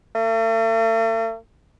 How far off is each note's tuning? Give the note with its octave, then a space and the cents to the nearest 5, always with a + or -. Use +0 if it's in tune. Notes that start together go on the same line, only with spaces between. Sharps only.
A3 +45